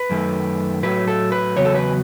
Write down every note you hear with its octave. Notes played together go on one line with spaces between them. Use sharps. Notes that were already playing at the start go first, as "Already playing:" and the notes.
Already playing: B4
F#2 D#3 A3
A2 F#3 A3 B4
A4
B4
E2 C#3 F#3 B3 C#5
A4
B4